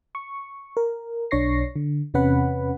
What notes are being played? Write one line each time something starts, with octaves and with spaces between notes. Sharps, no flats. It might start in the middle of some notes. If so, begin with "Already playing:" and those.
C#6
A#4
B1 D4 C#5 C#6 A#6 C7
D3
E2 C3 C#4 B4 F#5 B5